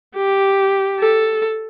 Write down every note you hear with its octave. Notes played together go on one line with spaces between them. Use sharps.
G4
A4